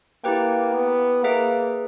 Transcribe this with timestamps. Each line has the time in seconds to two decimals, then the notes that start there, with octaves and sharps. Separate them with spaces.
0.24 A#3 E4 G4 B4 G5
0.74 B3
1.24 A#3 G#4 B4 E5